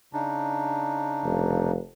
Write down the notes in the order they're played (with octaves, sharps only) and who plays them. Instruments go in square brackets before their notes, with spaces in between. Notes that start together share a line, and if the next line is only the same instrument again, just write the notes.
[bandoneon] C#3 D4 D#4
[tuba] F1